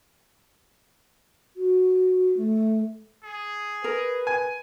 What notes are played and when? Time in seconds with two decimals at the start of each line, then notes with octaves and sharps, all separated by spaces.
1.56 F#4
2.37 A3
3.24 G#4
3.84 A#4 B4
4.27 G#5